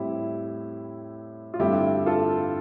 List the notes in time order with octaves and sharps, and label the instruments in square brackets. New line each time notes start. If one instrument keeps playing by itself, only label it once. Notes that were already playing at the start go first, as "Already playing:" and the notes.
Already playing: [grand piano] A2 G3 C4 E4
F4
G2 D3 A3 C4 E4 G4
F4 A4